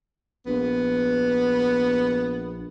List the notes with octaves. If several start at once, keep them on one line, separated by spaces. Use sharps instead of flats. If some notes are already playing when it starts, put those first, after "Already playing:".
A#1 B3